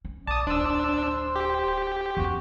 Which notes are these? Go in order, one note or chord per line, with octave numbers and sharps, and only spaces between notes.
C#4
A#1 D5 A5 D#6
D1 D4 C5 E6
G4
E2 C#4 F#4